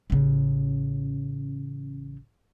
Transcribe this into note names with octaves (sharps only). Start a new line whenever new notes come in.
A1 C#3